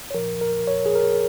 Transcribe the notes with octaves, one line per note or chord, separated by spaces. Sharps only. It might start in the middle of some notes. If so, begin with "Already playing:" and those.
C#5
A#2 F3 A#4
A#4
C#5
G#4
A#4